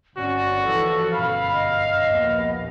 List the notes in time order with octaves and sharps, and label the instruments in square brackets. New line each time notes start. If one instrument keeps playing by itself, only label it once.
[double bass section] G1 G2 C#4 [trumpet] F#4 [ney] D5
[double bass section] E3 F3 [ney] A4
[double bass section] G1 F#2 B2 [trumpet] F5 [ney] B5
[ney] D#5
[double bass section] A#1 D#2 B3